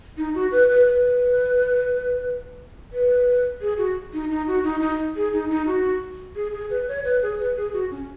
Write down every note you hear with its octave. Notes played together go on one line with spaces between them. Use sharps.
D#4
F#4
B4
B4
B4
B4
G#4
F#4
D#4
D#4
F#4
D#4
D#4
G#4
D#4
D#4
F#4
G#4
G#4
B4
C#5
B4
G#4
B4
G#4
F#4
C#4